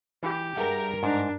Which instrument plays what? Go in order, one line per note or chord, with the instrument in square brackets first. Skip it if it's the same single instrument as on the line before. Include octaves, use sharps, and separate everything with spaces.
[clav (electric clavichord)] E3 [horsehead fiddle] G4
[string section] G2 A#4 [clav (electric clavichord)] G#4 E5 F#5
[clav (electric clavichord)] G#2 [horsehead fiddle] D4